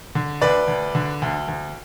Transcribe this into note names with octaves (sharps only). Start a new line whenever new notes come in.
D3
D2 B4 D5
D2
D3
D2
D2